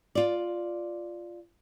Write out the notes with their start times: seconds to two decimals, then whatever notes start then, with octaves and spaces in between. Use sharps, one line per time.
0.15 F4 D5